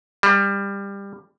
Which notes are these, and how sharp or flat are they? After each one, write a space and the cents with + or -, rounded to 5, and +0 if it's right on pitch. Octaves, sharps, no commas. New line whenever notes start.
G3 +20